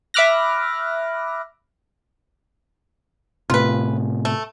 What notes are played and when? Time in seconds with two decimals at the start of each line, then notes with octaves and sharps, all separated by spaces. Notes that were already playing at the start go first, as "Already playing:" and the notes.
0.14 E5 B5 D6 F6 F#6 A#6
3.50 A2 C3 F4 B4
4.25 A3